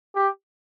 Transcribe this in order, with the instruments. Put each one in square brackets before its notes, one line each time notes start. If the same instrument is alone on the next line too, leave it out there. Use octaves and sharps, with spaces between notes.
[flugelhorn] G4